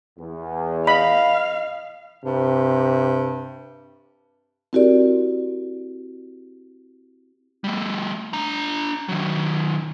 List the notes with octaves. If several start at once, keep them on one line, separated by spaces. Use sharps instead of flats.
E2
D#5 F5 B5
G2 C3
C4 E4 F#4 G4 A#4 D5
G3 A3
D4 A#5
D#3 F#3